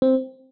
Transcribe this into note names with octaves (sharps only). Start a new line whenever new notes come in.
C4